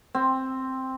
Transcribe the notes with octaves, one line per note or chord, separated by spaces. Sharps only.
C4